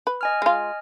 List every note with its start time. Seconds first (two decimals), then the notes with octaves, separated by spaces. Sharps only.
0.07 B4
0.21 D#5 G#5 F6
0.42 G#3 F4